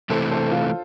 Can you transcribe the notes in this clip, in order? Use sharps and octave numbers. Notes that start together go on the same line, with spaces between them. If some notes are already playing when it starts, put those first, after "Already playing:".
C3 E3 A3 A4 C5
A4 C5
F4 A4